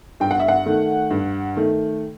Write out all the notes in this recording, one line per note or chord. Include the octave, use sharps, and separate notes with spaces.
G2 G5
F#5
E5
F#5
D#3 A3
G2
D#3 A3